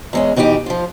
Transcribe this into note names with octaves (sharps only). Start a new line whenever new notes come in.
E2 G#3 C#4
B2 E3 D#4 F4 G4
F3 F4